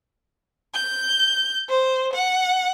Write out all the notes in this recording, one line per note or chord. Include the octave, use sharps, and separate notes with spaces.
G6
C5
F#5